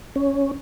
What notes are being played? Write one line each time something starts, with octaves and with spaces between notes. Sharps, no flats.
C#4